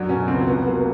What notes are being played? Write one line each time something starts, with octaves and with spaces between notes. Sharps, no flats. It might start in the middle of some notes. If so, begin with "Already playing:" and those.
Already playing: F#2 F#3 D4
B2 C#4
C#2 C4
F1 B3
F#3 A#3